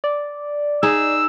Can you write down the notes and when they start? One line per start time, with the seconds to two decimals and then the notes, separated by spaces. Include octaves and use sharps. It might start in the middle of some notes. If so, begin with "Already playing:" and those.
0.04 D5
0.83 D#4 G#4 E6